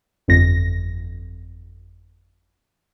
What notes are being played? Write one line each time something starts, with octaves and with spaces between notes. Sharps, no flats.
G1 F2 A#6